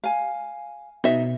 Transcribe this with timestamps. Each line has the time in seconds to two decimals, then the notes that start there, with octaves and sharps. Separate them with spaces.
0.04 F5 G#5
1.04 B2 D#4 E5